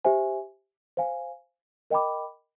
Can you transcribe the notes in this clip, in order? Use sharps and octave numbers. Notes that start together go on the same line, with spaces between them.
G4 C5 E5 G#5
C5 F5 G#5
A#4 D#5 G5 B5 D6